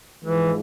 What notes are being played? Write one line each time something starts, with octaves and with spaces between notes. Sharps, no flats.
G#2 E3 F3 G#3